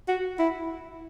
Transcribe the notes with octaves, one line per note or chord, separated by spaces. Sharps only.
F#4
E4